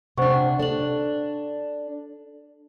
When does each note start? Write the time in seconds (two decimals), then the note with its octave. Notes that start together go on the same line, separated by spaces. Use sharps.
0.18 C3 D4 C5 F#5 C#6
0.59 D4 A4 F#7